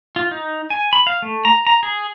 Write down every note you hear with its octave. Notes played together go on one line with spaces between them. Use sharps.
F4
D#4
G#5
B5
F5
A3
A#5
A#5
G#4